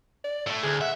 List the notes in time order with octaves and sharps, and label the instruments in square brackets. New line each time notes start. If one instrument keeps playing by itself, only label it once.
[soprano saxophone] D5
[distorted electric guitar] A2 A3
[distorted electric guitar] D2 [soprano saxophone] G#4
[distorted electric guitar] E5 [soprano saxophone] F#5